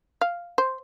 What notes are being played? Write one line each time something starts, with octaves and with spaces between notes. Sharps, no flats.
F5
C5